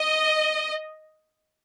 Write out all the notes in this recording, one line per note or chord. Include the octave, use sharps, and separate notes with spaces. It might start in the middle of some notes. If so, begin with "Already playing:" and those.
Already playing: D#5